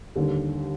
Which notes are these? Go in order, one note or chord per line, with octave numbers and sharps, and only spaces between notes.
D#2 D3 G3